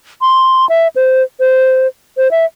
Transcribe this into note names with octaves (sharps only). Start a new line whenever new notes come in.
C6
E5
C5
C5
C5
E5